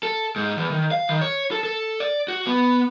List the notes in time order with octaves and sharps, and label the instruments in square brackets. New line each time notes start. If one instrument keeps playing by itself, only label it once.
[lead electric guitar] A4
G#2
E2
D#3
F5
D#3
C#5
A4
A4
D5
F#4
B3